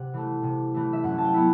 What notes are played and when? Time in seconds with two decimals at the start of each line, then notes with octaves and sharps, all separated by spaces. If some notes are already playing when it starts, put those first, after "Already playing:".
Already playing: C3 F#5
0.14 E3 A3
0.43 C3
0.74 E3 A3
0.93 E5
1.04 F#2 F#5
1.18 A5
1.24 G5
1.34 F#3 B3 E4